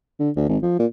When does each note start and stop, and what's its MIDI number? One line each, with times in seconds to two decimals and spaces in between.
0.20 0.30 50
0.37 0.44 38
0.49 0.57 32
0.63 0.77 53
0.79 0.86 46